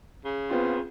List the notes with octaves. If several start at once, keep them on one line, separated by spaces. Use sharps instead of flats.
C#3
B3 C4 F4